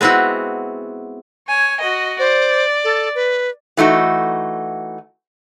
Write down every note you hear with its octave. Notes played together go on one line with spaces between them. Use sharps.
G#3 B3 C4 E4 F#4
C#5 G#5
F#4 D#5
C5 D5
A4
B4
E3 A3 D#4 F#4